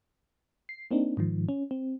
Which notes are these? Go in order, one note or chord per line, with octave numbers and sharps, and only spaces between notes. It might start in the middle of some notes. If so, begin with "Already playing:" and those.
C7
A#3 C4 D4 D#4
G#2 D#3 F3
C#4
C4